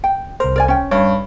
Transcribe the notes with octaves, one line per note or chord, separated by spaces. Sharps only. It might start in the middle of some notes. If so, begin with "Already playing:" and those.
G5
C2 A#4 C5
A#4 D5 G#5
C#4 G5
G2 C#5